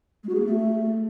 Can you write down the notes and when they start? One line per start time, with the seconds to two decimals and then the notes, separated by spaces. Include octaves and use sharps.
0.23 G#3
0.29 F#4
0.34 G#4
0.40 A#3
0.45 A3